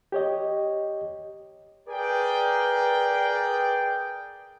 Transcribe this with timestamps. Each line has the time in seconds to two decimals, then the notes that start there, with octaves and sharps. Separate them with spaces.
0.12 G4 C#5 D#5
1.89 G#4 A#4 B4 D5 G5